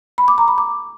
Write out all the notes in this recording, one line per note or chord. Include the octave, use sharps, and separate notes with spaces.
B5
D6
A#5
B5
D6